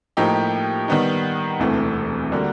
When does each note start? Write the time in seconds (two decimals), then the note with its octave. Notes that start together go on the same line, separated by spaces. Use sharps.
0.17 A2 F3 A#3 D#4 G4
0.88 D#3 G3 B3 D#4
1.60 E1 D2 C3 E3 A3
2.32 D3 G3 A#3 D4 F#4